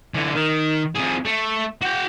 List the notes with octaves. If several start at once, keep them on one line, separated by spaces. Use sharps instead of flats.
D3 E3
D#3
F2 G#4
A3
F#4 G5